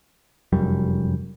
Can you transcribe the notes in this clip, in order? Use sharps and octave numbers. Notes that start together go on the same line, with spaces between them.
F1 F#2 G3